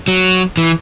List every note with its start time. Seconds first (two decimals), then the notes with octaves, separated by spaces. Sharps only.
0.08 F#3
0.57 E3